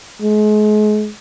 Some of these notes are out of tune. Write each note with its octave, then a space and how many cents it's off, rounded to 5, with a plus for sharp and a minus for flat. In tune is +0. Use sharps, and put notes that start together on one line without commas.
G#3 +35